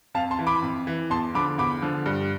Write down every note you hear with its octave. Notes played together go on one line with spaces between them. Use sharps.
F2 F5 A5
A5 C6
E3
B5 D6
F2
E3
E2 A5 C6
D3 F3 B5 D6
E2 B5 D6
D3 F3
G2